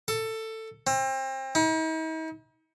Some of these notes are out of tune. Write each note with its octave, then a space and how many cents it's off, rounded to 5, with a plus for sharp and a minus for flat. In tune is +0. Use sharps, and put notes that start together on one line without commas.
A4 +15
C4 +30
D#4 +45